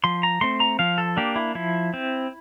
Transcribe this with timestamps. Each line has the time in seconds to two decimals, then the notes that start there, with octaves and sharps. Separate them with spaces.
0.04 F3 C6
0.23 A#5
0.41 A3 C4 C6
0.60 A#5
0.79 F3 F5
0.98 A4
1.17 A#3 D4 G4
1.36 E4
1.55 F3 E4
1.94 C4